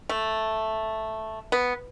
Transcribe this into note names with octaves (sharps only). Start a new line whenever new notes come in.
A3
B3